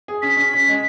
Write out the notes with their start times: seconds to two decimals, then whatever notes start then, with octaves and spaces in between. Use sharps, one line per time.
0.08 G#4
0.22 C#4 B6
0.37 C#4
0.53 C#4
0.68 G#3